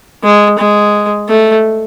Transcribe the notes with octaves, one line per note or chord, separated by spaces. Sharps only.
G#3
G#3
A3